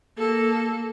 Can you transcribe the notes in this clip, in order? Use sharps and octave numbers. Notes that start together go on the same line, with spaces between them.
A#3 A4